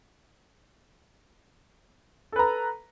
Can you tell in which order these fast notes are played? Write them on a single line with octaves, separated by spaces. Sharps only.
A4 B4 A#5